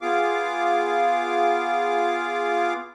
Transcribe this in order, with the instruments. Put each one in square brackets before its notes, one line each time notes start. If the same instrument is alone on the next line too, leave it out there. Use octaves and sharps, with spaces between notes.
[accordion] B3 F4 G#4 F5 D6